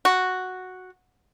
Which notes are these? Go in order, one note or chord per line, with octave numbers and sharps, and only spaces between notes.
F#4